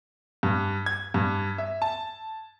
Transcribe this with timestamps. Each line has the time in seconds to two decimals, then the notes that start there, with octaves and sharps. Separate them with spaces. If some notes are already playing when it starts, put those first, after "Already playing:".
0.43 G2
0.86 G#6
1.14 G2
1.58 E5
1.82 A5